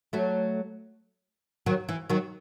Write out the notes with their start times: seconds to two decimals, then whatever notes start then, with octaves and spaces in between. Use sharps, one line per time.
0.13 F#3 A3
1.66 D#3 F#3
1.89 E3
2.10 D#3 F#3